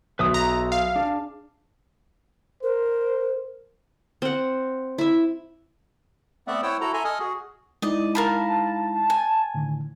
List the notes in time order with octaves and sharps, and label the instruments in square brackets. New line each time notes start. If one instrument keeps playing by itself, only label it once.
[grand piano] B1 [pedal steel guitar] B4 E5 D#6
[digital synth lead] A#5
F5
[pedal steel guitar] D4 [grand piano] G#4
[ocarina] A#4 [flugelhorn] C5
[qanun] C4 F#5
E4 E5
[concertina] A3 B3 C4 D5 E5 F#5
E4 C5 C#5 F#5 G5 E6
E4 F#4 A4 A#5
A4 E5 G#5 A#5 C6
A4 D#5 G#5 D#6 F6
F#4 G#4
[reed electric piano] G#3 D#4 E4 [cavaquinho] D5 D#5
[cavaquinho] A#4 F5 B5 [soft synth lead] A5
[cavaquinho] G#5
[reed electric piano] A2 D3 D#3